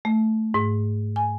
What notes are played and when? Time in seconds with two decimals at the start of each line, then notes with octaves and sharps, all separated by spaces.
0.05 A3
0.54 G#2
1.16 G#5